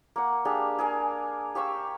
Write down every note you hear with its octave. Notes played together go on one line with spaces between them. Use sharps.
A#3 F#5
D4 G4 G#4 F5
G#4 A#4 F5 G#5
G4 F5 C#6 E6